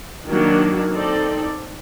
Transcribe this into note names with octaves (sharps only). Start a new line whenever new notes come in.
D#3 F#3 A#3 D4
C4 D#4 A4 D5